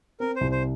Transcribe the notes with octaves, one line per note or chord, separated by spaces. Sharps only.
C4 A#4
C5
C2
C5